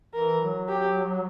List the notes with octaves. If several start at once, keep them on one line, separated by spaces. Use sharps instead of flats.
E3 A#4
F#3
G4